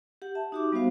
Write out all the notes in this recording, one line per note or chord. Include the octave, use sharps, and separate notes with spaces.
G4 F#5
E5 A5
D#4 F#4 G4 E5 D6
G3 B3 D#4 F#4 C5 F5